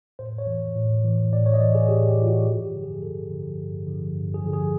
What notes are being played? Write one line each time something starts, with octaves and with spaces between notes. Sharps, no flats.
A2 C5
C#5
E3
A2
E3
A2 D5
C#5
D#5
E3 D5
G#4
A2 G4
G4
E3
F4
F#4
G2 G4
G4
D3 F3
G#4
G2 A4
D3 F3
G2
D3 F3
G2
G#4
D3 F3
G#4